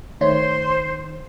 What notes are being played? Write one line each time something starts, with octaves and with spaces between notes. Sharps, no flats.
D#3 A3 C5 C#5 C6